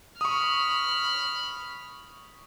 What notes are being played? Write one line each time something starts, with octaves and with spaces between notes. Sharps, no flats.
B5 C#6 D#6 F6